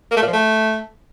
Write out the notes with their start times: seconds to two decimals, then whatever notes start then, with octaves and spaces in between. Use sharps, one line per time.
0.11 A#3
0.17 A3
0.22 A#2
0.27 F3
0.33 A3